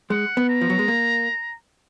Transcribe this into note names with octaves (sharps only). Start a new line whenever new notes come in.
G#3 F#5
B3
A#5
F3
F#3
G#3
A#3